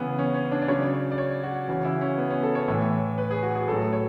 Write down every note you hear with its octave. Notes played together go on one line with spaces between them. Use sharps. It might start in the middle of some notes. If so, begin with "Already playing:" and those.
Already playing: C#3 E3 B3 G#4
C#4
C#4
D4
D5
C#3 F#3 C#5
D5
C#5
D5
C#5
F#4
C#3 E3 F#4
E4
C#4
B3
C#4
A4
C#5
A2 E3
B4
G#4
F#4
G#4
A2 F#3 A4
C#5